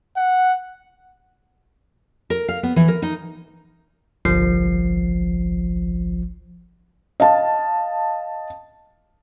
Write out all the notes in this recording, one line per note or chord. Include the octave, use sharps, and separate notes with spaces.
F#5
A#4
F5
B3
E3
A#4
D#4
G1 C2 F3 C7
D#5 F5 A5